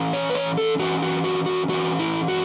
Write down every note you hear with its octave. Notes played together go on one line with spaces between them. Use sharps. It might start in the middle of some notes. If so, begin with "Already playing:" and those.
Already playing: E3 C#4
C#5
B4
C#5
A4
E3 C#4 F#4
F#4
F#4
F#4
E3 C#4 F#4
E4
F#4